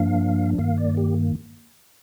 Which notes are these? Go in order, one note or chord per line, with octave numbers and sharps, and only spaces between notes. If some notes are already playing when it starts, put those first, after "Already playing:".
Already playing: G2 F3 A#3 D4 F5
G2 D#3 A#3 F5
D5
G4